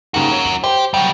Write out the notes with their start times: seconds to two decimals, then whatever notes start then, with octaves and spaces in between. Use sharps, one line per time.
0.14 D#2 G#2 C#3 F#4 A#4
0.31 C#5
0.45 F#7
0.64 G4 C5
0.94 F#3 G3 G5